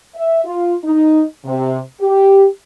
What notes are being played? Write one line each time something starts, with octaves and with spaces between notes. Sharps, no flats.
E5
F4
D#4
C3
G4